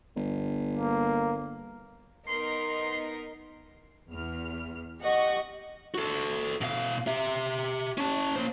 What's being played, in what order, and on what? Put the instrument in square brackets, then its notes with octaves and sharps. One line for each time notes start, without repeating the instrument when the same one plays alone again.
[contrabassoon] G1
[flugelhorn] A#3
[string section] B3 D#4 A#4 [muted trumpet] C6
[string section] E2 F6
[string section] G4 F#5 C#6 [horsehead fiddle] D#5
[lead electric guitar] F#4 A4
B2 F5
G4 E5
C#4 A5
A#3 C5